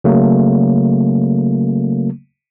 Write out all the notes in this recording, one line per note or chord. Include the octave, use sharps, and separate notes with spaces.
C#3 F#3 A3 A#3